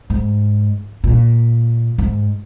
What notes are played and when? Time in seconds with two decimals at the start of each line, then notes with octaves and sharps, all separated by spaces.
0.10 G#2
1.04 A#2
1.98 G#2